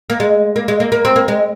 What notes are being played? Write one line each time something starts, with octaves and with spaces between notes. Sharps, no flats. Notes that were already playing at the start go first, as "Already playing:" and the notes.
A#3
G#3
A#3
G#3
A#3
A#3
C4
A#3
G#3